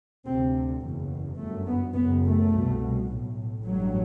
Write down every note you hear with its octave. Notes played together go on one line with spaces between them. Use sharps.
D2 C3 C4
F#1 E2 B2
G1 F#2 A3
B3
F#1 F#2 B3
A3
C2 B2
B1 A2
A1 G2 F#3